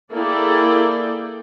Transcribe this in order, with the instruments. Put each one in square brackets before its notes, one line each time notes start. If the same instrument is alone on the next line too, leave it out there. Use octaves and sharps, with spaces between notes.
[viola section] A#3 E4 G#4 A4 D5 G5